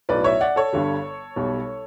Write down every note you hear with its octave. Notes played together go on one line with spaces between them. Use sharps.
B1 A2 F#3 B4 D5
C#5 E5
D5 F#5
A4 C#5
G1 G2 D3 G3
B1 B2 G3